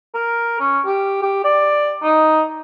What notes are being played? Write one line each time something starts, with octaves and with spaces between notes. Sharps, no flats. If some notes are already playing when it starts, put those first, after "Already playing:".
A#4
C#4
G4
G4
D5
D#4